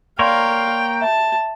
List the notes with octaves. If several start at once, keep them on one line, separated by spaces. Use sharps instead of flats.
A#3 A#4 C#5 D5 F5 G5 C6
E5 A5